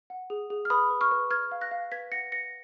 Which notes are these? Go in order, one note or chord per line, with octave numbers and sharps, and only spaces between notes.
F#5
G#4
G#4
F6
B4 B5 D#6
B4
C#6 F6
B4
B4 F6 G#6
F5
F#6 A#6
F5
B4 G#6 B6
F#5 A#6 C#7
B4 A#6 C#7